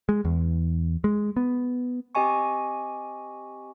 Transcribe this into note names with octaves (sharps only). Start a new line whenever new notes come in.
G#3
E2
G#3
B3
C4 G4 D#5 G#5 C#6